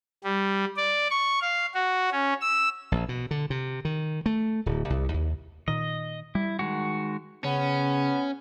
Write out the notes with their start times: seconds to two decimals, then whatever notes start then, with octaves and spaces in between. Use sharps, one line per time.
0.24 G3
0.77 D5
1.10 C#6
1.41 F5
1.74 F#4
2.11 C#4
2.41 E6
2.92 A#1
3.09 B2
3.31 D3
3.50 C3
3.85 D#3
4.26 A3
4.66 D1
4.90 C2
5.14 D#2
5.68 A#2 D#3 D#5
6.35 G3 E4
6.59 D#3 G#3 F#4
7.44 C#3 B3 C#4